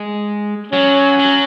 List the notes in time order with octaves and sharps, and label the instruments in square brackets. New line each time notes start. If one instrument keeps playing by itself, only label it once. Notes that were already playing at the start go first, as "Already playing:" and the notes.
Already playing: [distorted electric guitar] G#3
[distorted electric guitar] F#3 [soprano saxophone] C#4
[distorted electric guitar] F#3